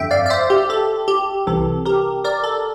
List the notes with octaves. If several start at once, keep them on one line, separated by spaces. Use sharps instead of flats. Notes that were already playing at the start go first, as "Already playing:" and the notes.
Already playing: G1 F2 D3 E5 G5
D5 F5
D5
C5 E5
G4
A4
G4
C2 C3 E3 A4
G4 A#4
A#4 D5
A4